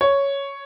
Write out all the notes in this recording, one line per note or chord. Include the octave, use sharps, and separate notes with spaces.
C#5